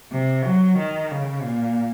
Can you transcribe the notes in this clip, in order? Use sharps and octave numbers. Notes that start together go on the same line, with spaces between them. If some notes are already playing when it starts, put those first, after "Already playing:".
C3
F#3
D#3
C#3
A#2